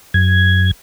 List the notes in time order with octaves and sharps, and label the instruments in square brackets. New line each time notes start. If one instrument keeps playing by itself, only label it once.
[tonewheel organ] F#2 G#6